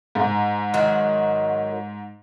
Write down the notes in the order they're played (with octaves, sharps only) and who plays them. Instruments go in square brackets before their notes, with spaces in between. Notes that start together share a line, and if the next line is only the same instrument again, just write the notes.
[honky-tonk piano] G#2
[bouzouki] D#3 F#3 F#4